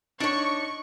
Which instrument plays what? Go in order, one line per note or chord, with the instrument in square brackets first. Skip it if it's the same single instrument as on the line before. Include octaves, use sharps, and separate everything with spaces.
[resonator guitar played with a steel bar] D4 C#5 [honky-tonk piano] D#4 [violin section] C#6